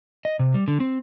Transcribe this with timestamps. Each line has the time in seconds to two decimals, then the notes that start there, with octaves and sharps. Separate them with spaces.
0.25 D#5
0.39 C3
0.54 G3
0.68 D3
0.80 C4